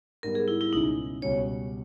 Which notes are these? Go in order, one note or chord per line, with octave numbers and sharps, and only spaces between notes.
G#2 G3 B3 A#4
G#4
E4
E4
C#2 B2 G#3 C#4 D#4 E4
C#2 B2 G3 C#4 C#5